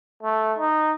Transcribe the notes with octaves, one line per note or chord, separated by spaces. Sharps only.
A3
D#4